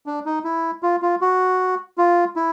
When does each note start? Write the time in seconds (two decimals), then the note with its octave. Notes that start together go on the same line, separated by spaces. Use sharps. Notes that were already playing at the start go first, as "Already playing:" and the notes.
0.06 D4
0.25 D#4
0.44 E4
0.83 F4
1.02 F4
1.21 F#4
1.98 F4
2.36 E4